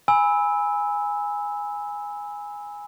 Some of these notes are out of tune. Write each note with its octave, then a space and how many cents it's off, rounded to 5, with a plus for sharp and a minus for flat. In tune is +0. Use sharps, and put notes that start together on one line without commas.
G#5 -10 B5 +0 E6 -15